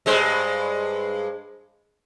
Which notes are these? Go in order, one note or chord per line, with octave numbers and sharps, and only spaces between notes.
G2 G#3 C5